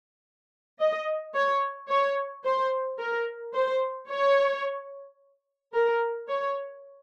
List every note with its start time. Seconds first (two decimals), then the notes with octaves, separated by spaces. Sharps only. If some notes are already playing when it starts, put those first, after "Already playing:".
0.80 D#5
1.35 C#5
1.89 C#5
2.44 C5
2.99 A#4
3.54 C5
4.08 C#5
5.74 A#4
6.28 C#5